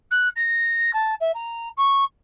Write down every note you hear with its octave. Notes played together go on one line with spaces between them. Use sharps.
F#6
A#6
A5
E5
A#5
C#6